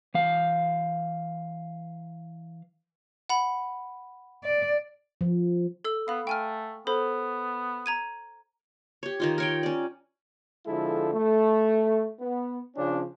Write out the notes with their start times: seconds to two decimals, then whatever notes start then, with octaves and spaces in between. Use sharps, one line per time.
0.14 E3 F5
3.29 F#5 B5
4.43 D5
5.21 F3
5.84 A4 E6
6.08 B3 F5 B5
6.27 A3 G5 G#5 F6
6.87 B3 A4 C5 B5
7.86 A#5 G#6 D#7
9.03 G4 C#5
9.20 D#3 D#4 F4
9.38 A#4 C#5 G5
9.63 C#4 D5
10.66 D3 F3 G#3 E4 A4
11.13 A3
12.20 B3
12.76 C#3 F3 C#4 D4